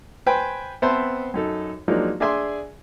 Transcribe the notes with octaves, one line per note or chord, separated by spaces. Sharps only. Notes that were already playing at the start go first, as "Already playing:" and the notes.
B4 C5 G5 G#5
B3 C4 B4 C5 E5 A5
F#2 D#4 A4
F3 F#3 G#3 A#3 D4 D#4
D4 G#4 D5 E5 G#5 C6